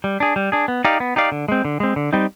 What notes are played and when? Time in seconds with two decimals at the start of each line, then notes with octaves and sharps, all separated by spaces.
0.04 G3
0.20 D4 G#4
0.36 G3
0.52 D4 G#4
0.68 B3
0.85 D#4 G4 D5 F5
1.00 B3
1.16 D#4 G4 D5 F5
1.32 D3
1.48 G#3 C4
1.65 D3
1.80 G#3 C4
1.96 D3
2.13 G3 C4 D#4